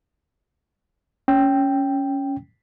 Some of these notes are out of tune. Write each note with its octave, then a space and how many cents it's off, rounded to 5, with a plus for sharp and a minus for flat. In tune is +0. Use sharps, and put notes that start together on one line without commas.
C#4 +5 G5 +0